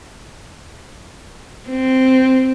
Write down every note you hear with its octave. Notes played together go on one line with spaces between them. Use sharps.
C4